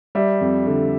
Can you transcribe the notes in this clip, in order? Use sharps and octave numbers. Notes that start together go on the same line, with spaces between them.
G3 E5
F2
D3